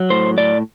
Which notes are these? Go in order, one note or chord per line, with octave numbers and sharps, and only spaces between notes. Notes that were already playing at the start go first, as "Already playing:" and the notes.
Already playing: F#3
A2 C5
A2 D5